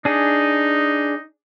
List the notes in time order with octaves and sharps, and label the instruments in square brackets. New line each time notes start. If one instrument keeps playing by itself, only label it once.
[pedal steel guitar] D4 G#4 [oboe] D#4